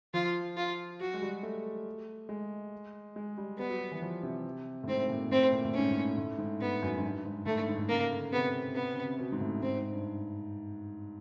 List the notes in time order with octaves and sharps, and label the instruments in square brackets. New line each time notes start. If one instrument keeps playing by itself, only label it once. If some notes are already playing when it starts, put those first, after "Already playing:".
[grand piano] F3 [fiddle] F4
[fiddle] F4
[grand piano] F#3 [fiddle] F#4
[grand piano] G#3
G3
A3
G#3
G#3
G3
[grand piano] G3 [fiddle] B3
[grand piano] F#3
F#3
E3
F3
C3
A2
[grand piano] G#2 [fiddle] C4
[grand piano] A#2
[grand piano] A2 [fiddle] C4
[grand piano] A#2
A2
[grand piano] G#2 [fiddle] C#4
[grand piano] A2
A2
G#2
[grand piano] G2 [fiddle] B3
[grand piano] F#2
G#2
G2
G#2
[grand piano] A2 [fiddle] A3
[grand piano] G2
G#2
A2
[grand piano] C#3 [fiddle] A#3
[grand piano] D3
[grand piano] C3 [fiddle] B3
[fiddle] B3
[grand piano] C#3
C3
B2
G#2
A2
[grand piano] G#2 [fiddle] C4
[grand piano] G2